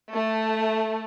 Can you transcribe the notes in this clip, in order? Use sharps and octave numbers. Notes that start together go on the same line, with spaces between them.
A3